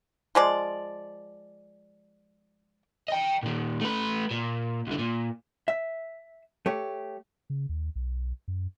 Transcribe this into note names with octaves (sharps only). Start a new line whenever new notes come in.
F3 G#3 D5
D#5 G5
A#2 D#3
A3 B4
A#2
C2 D3
A#2
E5
A3 G4 C#5
C#3
D#2
B1
F#2